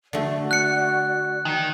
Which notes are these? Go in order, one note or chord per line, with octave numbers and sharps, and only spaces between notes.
D3 A3 F#4 D5
F#6 C#7
D#3